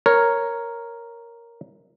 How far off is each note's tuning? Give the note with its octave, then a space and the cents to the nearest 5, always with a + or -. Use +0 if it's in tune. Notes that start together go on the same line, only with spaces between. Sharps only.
A#4 +0 C#5 +0